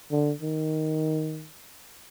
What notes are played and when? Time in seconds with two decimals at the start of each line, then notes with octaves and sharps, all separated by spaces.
0.11 D3
0.42 D#3